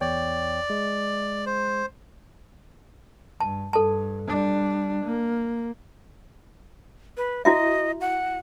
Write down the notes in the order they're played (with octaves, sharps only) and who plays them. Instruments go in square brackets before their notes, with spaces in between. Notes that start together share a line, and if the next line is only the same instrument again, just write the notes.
[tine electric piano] E2 C#5 G5 [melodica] D5
[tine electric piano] G#3
[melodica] C5
[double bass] G2 [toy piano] A5
[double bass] G2 [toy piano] A4 A5
[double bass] G3 D4
A#3
[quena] B4
[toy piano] E4 F#4 E5 [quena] D#5
[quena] F#5